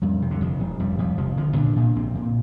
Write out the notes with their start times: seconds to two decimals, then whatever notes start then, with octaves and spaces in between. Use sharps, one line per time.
0.02 F2 G3
0.22 C3
0.31 D3
0.41 F1 F3
0.60 F1
0.79 F2 G3
0.98 F2 G3
1.18 F1 F3
1.37 D3 F3
1.57 A#2 D4
1.76 A#2
1.96 A#1 C4
2.15 A#2